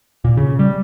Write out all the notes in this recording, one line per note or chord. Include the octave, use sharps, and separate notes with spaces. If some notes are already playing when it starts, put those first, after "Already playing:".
A#2
C#3
G3